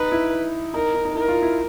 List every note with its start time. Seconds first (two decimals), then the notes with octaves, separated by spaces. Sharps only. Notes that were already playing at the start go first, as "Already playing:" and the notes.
Already playing: D#4 B4
0.12 E4
0.74 D#4 A#4
0.94 D#4
1.05 D#4
1.15 E4 A#4
1.28 F4
1.42 E4